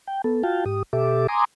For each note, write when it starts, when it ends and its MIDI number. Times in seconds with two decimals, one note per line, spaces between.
0.08 0.22 79
0.24 0.43 59
0.24 0.43 69
0.44 0.64 65
0.44 0.64 66
0.44 0.64 77
0.44 0.64 79
0.44 0.64 81
0.66 0.83 44
0.66 0.83 67
0.66 0.83 87
0.93 1.27 47
0.93 1.27 67
0.93 1.27 69
0.93 1.27 76
0.93 1.27 86
1.28 1.45 80
1.28 1.45 82
1.28 1.45 84
1.28 1.45 86
1.28 1.45 87